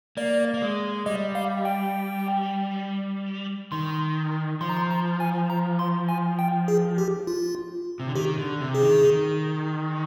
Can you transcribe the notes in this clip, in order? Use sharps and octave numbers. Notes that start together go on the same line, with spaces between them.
A#3 D5
A#3
G#3
G3 D#5
F5
G5
D#3 C6
F3 C6
A#5
C6
A#5
G#5
A#5
C6
G#5
G5
G#4
G4
F4
C3
D3
D#3 G4
D3
C3
G#4
D#3
D#3